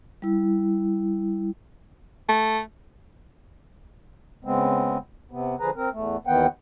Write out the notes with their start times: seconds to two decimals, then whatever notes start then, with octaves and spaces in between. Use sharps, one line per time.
0.22 G3 E4
2.29 A3
4.45 C#3 G#3 B3 C4
5.31 C3 B3
5.60 D3 F3 G#4 B4 A#5
5.76 C4 A#4
5.93 E2 A3
6.27 D#2 D#3 E3 B3 F#5 G5